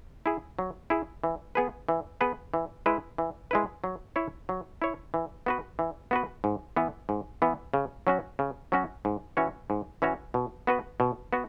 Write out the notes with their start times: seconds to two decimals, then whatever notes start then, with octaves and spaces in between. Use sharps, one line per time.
0.26 E4 G#4
0.59 F#3
0.90 E4 G#4
1.24 E3
1.55 B3 G#4 B4
1.89 E3
2.21 B3 G#4 B4
2.54 E3
2.86 G#3 E4 B4
3.18 E3
3.51 G#3 E4 B4
3.84 F#3
4.16 E4 C#5
4.49 F#3
4.82 E4 C#5
5.14 E3
5.46 B3 F#4 B4
5.79 E3
6.11 B3 F#4 B4
6.44 G#2
6.76 E3 B3
7.09 G#2
7.42 E3 B3
7.74 C#3
8.07 F#3 C#4 F#4
8.39 C#3
8.72 F#3 C#4 F#4
9.05 G#2
9.37 E3 C#4 F#4 C#5
9.70 G#2
10.02 E3 C#4 F#4 C#5
10.34 B2
10.67 B3 F#4 B4
11.00 B2
11.33 B3 F#4